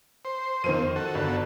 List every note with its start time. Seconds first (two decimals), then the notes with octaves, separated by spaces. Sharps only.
0.25 C5
0.64 F2 D#3 C5 D#7
0.96 F#4 A4
1.15 G1